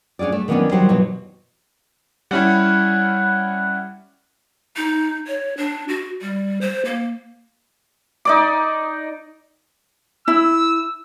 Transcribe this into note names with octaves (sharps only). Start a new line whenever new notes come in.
C#4 D4 F4 G#4 D5
A3
D#3 E3 F#3 B3 C#4 D4
D#3 F#3 G3 G4 C5
B2 E3 F#3
G3 C#4 E4 F#5
D#4
C#5
D4
F#4
G3
C5
A#3
D#4 D5 D6
E4 E6